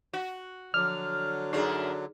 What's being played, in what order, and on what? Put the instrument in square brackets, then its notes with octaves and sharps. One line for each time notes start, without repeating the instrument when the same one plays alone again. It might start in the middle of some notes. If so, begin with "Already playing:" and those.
[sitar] F#4 [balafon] F#5
[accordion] D3 F#3 [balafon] F3 [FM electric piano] F6
[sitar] F#2 B2 D4 [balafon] D#4 G#4 D5